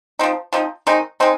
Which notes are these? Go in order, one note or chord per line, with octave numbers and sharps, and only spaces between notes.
F3 C4 D#4
F3 C4 D#4
D#3 G#3 C4 D#4
G#3 C4 D#4